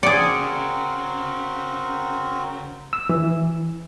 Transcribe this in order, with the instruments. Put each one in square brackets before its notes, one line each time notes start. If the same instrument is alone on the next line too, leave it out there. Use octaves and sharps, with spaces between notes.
[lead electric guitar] C#3 [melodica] C4 F#4 A#4 [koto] G#4 D5 [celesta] C#7 D7
[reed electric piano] E6
E3